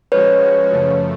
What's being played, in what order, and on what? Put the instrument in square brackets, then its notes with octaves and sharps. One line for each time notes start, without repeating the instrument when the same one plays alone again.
[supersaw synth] F3 G#3 C#4 F#4 [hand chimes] B4 C#5
[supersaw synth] F#2 C#3 F3 A3